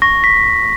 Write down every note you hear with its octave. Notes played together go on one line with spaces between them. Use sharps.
C#6 A#6
B6